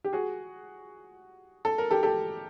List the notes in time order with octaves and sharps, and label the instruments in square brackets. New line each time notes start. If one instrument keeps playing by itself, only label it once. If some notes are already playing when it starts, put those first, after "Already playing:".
[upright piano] G4
F#4 G#4
A4
A#4
G4 A4
G4 A4